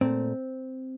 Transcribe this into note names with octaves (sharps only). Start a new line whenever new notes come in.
A#2 A3 C4